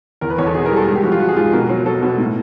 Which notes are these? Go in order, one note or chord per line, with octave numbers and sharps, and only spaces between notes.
E2 A#4
B4
E2 C#5
A4
B2 G#4
A#4
G3
A4
G#2 G#4
G4
F3 F#4
F4
F3 F#4
G#4
G#2 F4
B2 A#4
F#3
F#3 A4
B2
A2